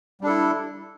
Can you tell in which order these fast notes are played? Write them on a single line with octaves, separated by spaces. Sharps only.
G3 D4 A4 E4